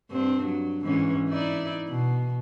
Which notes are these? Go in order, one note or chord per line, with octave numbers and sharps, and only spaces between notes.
G2 C4 D4
F#3
G#2 E3 C#4
D#4 E4 D5
B2